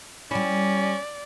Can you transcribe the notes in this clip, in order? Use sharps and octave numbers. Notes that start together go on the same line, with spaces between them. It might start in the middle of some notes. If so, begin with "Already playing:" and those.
G3 C#4 E4 D5